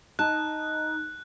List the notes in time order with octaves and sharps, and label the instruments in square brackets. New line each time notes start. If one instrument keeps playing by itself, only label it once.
[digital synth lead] D#4 [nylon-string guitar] A5 [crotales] F#6